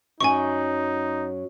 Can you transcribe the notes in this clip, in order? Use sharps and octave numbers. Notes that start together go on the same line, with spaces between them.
F#2 F#3 D#4 G#5 C#6